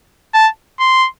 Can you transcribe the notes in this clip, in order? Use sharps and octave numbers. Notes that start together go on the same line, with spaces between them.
A5
C6